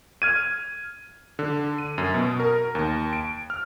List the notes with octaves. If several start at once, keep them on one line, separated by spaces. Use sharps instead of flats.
F6 G#6 D#7
D3
D#7
F#2
B2
A#4
D#2
D7
F6